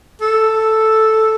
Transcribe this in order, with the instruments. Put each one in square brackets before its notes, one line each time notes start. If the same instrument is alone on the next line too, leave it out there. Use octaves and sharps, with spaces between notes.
[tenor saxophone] A4